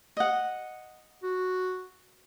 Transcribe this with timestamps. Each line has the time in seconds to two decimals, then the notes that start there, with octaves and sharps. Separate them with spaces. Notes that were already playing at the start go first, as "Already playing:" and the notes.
0.17 D#5 F#5
1.23 F#4